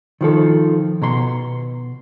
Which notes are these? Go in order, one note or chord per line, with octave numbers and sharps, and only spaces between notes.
D#3 F3 A4
B2 A#5 C6